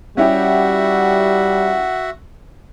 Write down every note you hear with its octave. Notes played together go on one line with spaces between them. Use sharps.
G3 C#4 E4 F#4 G4 E5 F#5